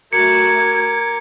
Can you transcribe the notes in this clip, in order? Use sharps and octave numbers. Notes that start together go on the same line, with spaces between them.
A3 F#4 A#4 D6 G#6 C#7